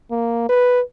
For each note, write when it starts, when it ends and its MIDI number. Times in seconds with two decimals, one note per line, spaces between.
0.11 0.48 58
0.49 0.81 71